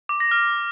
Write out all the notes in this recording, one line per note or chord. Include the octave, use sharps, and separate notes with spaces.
D6
A#6
F6